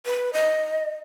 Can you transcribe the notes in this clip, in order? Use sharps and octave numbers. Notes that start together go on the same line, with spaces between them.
B4
D#5